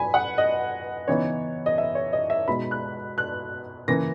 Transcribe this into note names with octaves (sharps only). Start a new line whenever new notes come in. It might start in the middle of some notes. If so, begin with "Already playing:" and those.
Already playing: F#3 G#5 B5
F#5
D#5
C#3 E3 B3 D#4 C#5
D#5
E5
C#5
D#5
E5
B2 G#3 D#4 B5
F#6
F#6
C#3 E3 A#3 A#6